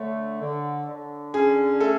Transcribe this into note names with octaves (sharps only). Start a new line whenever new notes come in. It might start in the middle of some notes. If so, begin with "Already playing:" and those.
Already playing: D3 A3 C#5
D3
D3
C#4 G#4
A3 A4